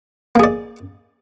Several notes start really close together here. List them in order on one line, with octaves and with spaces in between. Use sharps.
A#3 G#4 D5